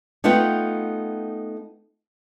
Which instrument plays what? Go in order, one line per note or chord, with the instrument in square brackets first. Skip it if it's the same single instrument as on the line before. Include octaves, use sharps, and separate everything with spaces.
[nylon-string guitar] A3 B3 D#4 F4 F#5 G5